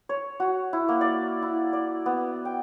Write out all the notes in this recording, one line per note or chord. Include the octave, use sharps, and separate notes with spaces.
C#5
F#4
E4
A#3
D5
E4
D5
B3
G5